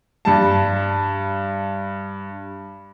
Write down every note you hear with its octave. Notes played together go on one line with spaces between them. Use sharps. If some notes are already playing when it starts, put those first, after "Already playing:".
G2 G3 A5